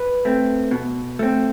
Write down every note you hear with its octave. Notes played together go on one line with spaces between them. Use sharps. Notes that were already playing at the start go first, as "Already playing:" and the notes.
Already playing: B4
A3 C4
B2
A3 C4